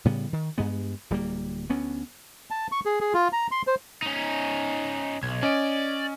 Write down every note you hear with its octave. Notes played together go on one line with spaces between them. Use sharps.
A2 C#3 G3 B3
D#3
G2 G#3 B3
D1 G3 A#3
D2 B3 C#4
A5
C#6
G#4
G#4
F4
A#5
C6
C5
C#4 D#4
B1 G#6
C#4 D5 D#5 D7